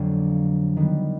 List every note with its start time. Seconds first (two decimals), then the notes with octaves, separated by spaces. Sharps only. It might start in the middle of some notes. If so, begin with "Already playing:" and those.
Already playing: F2 D3 F#3 A#3 D4
0.76 D#3 G3 B3